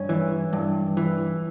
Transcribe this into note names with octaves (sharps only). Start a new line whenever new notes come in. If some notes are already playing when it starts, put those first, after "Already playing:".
Already playing: G2 C#4
E3
G2
E3